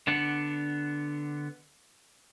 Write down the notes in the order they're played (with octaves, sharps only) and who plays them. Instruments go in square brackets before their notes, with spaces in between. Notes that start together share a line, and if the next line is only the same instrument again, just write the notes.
[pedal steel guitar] D3 B3 D4 F#5